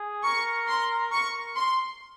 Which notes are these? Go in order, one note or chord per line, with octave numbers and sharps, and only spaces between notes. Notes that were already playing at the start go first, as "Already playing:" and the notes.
Already playing: G#4
A#4 C#6
C6
A#4 C#6
C6